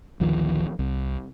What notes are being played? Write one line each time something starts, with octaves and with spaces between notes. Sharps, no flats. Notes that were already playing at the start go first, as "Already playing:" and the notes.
A1 D2 D#3 F3
C2